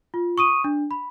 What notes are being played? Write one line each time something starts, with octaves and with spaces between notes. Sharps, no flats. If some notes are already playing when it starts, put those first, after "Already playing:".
F4
C#6 D#6 D#7
D4
B5